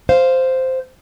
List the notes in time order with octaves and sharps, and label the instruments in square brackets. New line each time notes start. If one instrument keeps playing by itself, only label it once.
[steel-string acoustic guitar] C5 F5